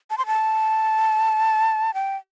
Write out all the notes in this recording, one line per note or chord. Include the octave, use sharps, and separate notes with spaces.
A5
C6
A5
G5